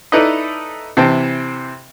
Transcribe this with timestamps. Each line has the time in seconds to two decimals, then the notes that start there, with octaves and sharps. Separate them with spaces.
0.12 D#4 E4 A4 B4 D5 D#5
0.97 C3 E3 C4 G5 A5